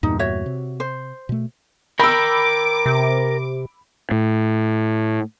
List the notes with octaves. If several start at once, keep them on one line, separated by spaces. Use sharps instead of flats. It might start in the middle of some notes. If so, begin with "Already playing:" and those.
E2 G2 A#2 D#4
F#4 C#5 E5
C3
C5
B2 A3
A#4 G5 B5 D6 E6
C3
A2